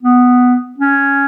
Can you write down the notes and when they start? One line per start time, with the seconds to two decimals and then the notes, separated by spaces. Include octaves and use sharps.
0.03 B3
0.78 C#4